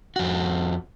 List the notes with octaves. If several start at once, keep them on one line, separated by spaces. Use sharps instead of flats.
F2 F#4